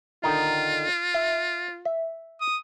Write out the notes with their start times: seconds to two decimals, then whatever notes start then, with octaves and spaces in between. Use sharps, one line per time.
0.24 D3 D#3 D#4 F4
1.14 E5
1.85 E5
2.41 D#6